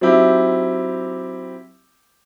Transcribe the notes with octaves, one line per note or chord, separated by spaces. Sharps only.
F#3 C4 D#4 E4 G4